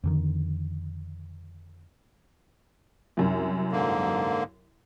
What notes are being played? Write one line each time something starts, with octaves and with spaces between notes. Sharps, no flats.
F2 D3 D#3
C2 F#2
G#2 D3 A#3